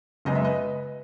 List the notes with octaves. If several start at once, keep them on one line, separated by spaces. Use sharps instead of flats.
F#1 F#2 C#3 G#3 B3 D#5
E5
B4 D#5